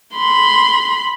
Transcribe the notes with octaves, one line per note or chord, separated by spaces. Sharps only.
B5 C6